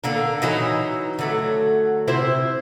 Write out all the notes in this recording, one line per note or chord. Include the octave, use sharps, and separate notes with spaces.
D3 A#3 D4
E3 F#3 D#4
D3 F#3 A3
C3 E4 C5